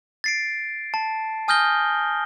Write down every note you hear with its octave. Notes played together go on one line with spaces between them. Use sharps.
A6 C7 D7
A5
G#5 D#6 F6 G6 A#6 G7